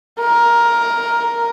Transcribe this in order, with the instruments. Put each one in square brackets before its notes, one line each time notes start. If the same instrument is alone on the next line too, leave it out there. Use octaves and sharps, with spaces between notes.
[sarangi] A#4